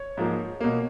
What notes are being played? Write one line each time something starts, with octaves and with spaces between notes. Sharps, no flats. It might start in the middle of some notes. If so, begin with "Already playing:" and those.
Already playing: C#5
G#2 F3 A#3
B2 A#3